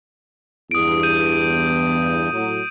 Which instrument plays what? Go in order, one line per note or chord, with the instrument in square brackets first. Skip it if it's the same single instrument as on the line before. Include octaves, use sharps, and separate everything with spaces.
[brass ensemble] E2 G2 [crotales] D#6 D7
[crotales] G6 D#7
[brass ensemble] A2 F#3